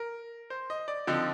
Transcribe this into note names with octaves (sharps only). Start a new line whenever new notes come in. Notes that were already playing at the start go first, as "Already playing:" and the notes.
Already playing: A#4
C5
D#5
D5
D3 F3 C4 D#4